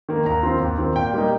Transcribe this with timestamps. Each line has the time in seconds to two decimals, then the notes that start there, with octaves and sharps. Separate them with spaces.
0.09 D#3 A#3
0.26 D#2 A#5
0.43 D#3 C4 F4
0.60 D#2
0.78 D#3 C4 F4
0.95 A#2 G5
1.13 G3 A#3 D#4